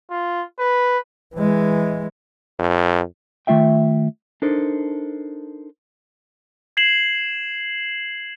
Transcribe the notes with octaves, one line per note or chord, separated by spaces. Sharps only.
F4
B4
E3 G#3
F2
D#3 A3 F4 E5 G5
D4 D#4 A4 A#4 C5
G#6 C7 E7 F#7